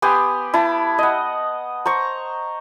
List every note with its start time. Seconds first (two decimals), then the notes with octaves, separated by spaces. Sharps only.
0.02 B3 G4 G#5 C6
0.54 E4 A5 B5
0.98 D#5 F#5
1.86 C5 A#5 C#6